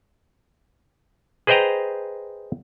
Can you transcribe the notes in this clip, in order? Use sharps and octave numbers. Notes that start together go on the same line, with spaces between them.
G#4 B4 C5 D#5 G5 A#5